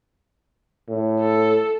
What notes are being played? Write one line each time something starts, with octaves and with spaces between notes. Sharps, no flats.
A2
A4